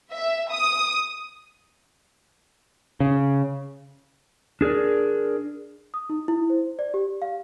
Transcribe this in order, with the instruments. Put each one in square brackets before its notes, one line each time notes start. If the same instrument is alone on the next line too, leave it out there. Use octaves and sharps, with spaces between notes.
[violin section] E5
D#6
[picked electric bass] C#3
[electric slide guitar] D4 G#4 A#4 D5
[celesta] D#6
D#4
E4
C5
D5
G4
F5